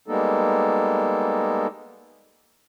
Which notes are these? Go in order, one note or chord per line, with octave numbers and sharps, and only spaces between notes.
G3 G#3 A#3 B3 D#4 A4